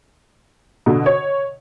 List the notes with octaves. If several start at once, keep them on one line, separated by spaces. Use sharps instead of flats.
B2 D3
C#5